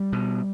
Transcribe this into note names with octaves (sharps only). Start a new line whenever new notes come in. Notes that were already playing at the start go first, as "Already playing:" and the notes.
Already playing: G3
B2